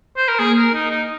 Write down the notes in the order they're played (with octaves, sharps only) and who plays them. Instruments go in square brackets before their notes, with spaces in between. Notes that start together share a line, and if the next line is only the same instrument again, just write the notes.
[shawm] C5
A#4
[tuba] A#3 [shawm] G#4
[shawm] A#4
D#4
D#4